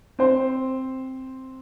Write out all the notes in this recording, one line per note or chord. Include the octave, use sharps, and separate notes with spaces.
C4 C5